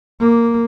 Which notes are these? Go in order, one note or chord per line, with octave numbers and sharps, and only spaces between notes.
A#3